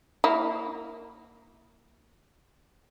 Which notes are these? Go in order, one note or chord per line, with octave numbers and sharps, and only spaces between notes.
A#3 E4